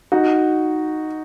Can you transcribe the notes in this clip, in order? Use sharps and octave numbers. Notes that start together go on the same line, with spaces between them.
D#4 F#4